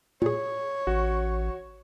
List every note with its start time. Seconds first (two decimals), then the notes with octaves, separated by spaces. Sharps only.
0.22 A#2 G#4 C#5
0.87 A1 F#4